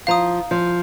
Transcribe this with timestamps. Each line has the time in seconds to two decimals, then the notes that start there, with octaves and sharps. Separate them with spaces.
0.07 F3 F5 A#5 D#6
0.51 F3